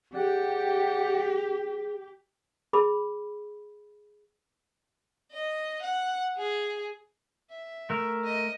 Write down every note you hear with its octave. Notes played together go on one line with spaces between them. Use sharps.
G4 G#4 D5 F#5 G5
G#4 B5
D#5
F#5
G#4
E5
A3 A#4
D#5